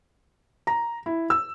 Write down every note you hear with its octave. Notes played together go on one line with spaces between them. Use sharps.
A#5
E4
E6